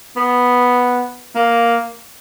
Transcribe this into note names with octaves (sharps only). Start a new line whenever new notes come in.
B3
A#3